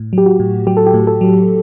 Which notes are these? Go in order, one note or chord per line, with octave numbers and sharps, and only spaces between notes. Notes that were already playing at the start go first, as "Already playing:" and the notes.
Already playing: A2
F#3 G4
F#4
A2
F#3 G4
A4
G4
A2
A4
F#3